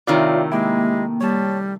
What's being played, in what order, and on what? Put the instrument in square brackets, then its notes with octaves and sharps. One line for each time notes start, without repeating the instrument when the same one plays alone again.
[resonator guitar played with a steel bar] A2 C3 D#3 [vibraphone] F4 C#5 E5 [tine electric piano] D5 F5
[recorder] G#3 [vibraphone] A#3 [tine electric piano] E4 G4
[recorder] G3 [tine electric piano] C#5 A5